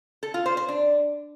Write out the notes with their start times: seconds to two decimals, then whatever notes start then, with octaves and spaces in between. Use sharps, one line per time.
0.23 A4
0.34 F4
0.46 C5
0.57 C5
0.69 D4